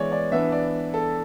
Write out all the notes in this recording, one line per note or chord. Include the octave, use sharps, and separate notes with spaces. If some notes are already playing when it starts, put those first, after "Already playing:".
Already playing: E3 G#3 B3 C#5 D5
D5
E3 B3 D4 E5
D5
A4